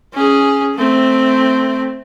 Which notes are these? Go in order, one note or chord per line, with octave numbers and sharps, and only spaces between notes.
C#4 G#4
A3 C4